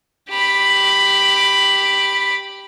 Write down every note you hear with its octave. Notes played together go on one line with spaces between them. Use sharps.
G4 B5